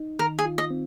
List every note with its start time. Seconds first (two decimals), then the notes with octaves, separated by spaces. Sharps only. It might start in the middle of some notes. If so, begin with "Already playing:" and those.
Already playing: D#4
0.19 D#3 A#4
0.39 G#4
0.45 F4
0.58 D#5
0.70 C4